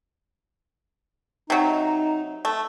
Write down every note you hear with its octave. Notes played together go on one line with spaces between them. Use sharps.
C3 F#3 D#4
A3